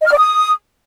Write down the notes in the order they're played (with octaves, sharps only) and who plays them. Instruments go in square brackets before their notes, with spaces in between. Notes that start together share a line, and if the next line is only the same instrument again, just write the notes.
[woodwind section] D#5
F6
D5
D#6